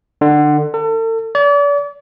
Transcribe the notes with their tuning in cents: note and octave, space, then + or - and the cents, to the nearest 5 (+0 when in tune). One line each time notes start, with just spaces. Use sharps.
D3 +25
A4 +40
D5 -40